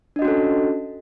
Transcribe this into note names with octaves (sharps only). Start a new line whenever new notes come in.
C#4 D4 F#4 A4 D#5